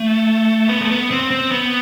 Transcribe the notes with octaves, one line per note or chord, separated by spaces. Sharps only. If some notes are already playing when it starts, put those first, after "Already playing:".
Already playing: A3
B3
A3
B3
C4
C4
B3